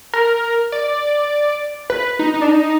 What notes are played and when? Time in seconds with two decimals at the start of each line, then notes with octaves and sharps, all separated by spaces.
0.14 A#4
0.72 D5
1.90 B4
2.19 D#4
2.34 D#4
2.41 D4
2.49 D#4